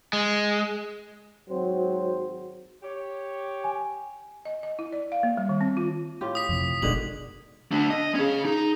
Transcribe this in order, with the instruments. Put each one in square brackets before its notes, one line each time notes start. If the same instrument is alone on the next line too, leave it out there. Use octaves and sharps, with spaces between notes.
[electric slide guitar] G#3
[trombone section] G#1 C4 C5 [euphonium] F#3
[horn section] G4 C#5
[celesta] G#5
[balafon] D#5
D#5
E4
D5
F5
A#3
G3
D#3
C4
F4
[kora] A2 F4 G4
[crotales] D#6 B6
[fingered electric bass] F2 C3
[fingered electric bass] F#1 B2 [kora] D3 D#3 G#3 [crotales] F#7
[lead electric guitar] A3 D4
D#5
C#4 G#4
D#4